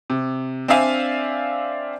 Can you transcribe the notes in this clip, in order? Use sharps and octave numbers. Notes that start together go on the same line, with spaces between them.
C3
C4 D4 D5 E5 F5 G#5